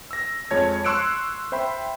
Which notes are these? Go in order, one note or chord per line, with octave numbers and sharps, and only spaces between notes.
E6 A#6
F2 G#3 C#5 A5 G#6
C6 C#6 E6 F#6 C#7 D7
C5 E5 G5 B5 C6